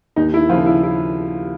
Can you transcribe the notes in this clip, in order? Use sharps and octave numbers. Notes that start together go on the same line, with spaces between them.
D#2 D#4
E4
C#3 F3 F4
E4
E4